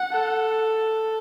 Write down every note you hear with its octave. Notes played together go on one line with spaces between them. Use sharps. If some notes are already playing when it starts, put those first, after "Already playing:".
Already playing: F#5
A4